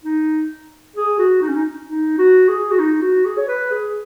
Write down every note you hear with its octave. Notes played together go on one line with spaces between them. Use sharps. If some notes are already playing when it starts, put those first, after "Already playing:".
D#4
G#4
F#4
D#4
C#4
D#4
D#4
F#4
G#4
F#4
D#4
F#4
G#4
C#5
B4
G#4